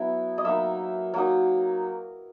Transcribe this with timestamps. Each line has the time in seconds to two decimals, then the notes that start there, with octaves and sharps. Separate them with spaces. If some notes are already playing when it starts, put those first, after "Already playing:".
Already playing: F#3 B3 E4
0.38 D#5
0.45 F#3 A#3 D#4 E5
1.14 F#3 A#3 D#4